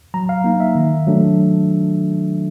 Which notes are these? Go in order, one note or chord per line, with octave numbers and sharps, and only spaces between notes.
F#3 A#5
F5
A#3 D#4
E5
D#3
F#3 A3 D4